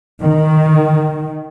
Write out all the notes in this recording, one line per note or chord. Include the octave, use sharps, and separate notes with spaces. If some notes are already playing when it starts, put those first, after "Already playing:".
D#3